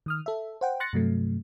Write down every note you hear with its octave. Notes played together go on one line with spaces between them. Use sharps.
D#3 D#6 F6
A4 E5
C5 F#5 G5
C6 F#6 A6 A#6 C#7
G2 C3 F#3 A3